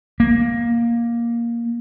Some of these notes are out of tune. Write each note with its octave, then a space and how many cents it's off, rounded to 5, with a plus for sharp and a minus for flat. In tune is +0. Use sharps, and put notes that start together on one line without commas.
A#3 +10